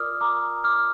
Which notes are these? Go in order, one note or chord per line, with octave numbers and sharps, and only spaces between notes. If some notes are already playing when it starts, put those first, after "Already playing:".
Already playing: F4 A#4 D5 D6 D#6 F6
A#5 D6
D6 F6